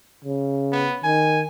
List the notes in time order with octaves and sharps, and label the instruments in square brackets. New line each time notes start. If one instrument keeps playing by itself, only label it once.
[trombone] C#3
[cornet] B3
[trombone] D#3 [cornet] G#5